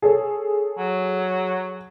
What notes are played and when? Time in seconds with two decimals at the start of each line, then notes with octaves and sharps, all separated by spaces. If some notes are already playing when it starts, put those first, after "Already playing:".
0.02 G#4 A4 C#5
0.78 F#3